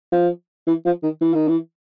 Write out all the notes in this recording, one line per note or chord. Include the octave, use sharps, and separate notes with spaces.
F3
E3
F3
D#3
E3
D#3
E3